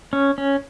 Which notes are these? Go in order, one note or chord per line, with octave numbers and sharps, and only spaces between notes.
C#4
C#4